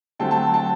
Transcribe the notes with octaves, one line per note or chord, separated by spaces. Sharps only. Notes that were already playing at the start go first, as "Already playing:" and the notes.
D3 F#3 A3 C4 G5 A5
G5 A5
G5 A5